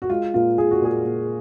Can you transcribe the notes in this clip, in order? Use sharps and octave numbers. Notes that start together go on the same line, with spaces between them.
F#4
G#3 F4
A#2 F4
A#2 G#4
F#4
A#2 G#4
A#2